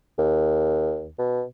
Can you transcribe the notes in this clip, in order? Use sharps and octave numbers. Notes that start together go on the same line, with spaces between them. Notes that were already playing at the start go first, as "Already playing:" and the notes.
D#2
B2